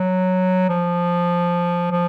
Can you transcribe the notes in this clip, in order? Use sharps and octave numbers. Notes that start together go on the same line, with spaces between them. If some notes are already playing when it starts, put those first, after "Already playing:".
Already playing: F#3
F3
F3